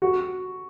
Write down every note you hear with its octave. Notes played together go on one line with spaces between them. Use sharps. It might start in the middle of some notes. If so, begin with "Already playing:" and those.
F#4